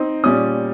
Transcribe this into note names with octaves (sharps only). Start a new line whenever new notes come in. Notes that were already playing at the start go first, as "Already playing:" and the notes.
Already playing: C4 D#4
A#2 G3 C#4 D#6